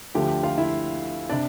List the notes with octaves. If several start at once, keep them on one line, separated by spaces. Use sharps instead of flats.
D2 D3 F3 G4 G5
F4 F5
E4 E5
C3 D4 D5